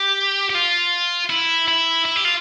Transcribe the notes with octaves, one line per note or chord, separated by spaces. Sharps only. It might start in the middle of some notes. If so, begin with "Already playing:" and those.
Already playing: G4
G4
F4
E4
E4
E4
G4
F4